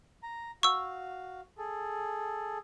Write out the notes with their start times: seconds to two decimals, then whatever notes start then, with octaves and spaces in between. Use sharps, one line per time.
0.23 A#5
0.63 F#4 F5 C#6 E6
1.58 G#4 A4